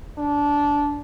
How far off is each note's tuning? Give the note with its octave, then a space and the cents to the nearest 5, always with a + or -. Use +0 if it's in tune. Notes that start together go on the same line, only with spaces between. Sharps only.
D4 -15